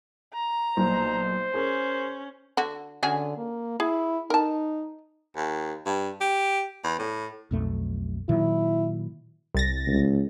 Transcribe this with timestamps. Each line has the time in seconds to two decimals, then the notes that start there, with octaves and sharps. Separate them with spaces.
0.34 A#5
0.77 B1 A#2 C5
1.54 C#4 G#4 A#4
2.57 D3 F#4
3.03 D3 C#4 F#4 G#4
3.37 A#3
3.80 E4 G#4
4.30 D#4 A#4 A5
5.36 D#2
5.85 G2
6.21 G4
6.84 E2
6.99 A2
7.51 B1 F2 A3
8.29 A#2 D#3 F#3 E4
9.54 C2 A6 A#6
9.87 C#2